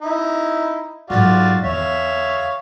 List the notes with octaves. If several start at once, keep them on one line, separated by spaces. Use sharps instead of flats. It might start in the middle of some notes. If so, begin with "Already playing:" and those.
D#4 E4
G#2 F#3 F4 F#4 D5
E2 C#5 E5 F5